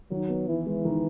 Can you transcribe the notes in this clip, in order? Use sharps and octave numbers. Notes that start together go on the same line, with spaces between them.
D#3 F#3
B3
E3 E4
G#3
D#3